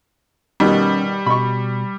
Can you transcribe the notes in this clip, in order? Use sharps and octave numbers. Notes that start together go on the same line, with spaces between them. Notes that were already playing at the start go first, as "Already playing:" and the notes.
B2 D#3 G3 C#4
B2 B5 C#6